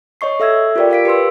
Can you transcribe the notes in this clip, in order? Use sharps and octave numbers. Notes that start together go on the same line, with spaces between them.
C#5 D#5 C#6 C7
A4 E5 E6 G#6
F4 G4 A#4 D5 G5
A#4 F5 B6 D7
G4 B4 C6 E6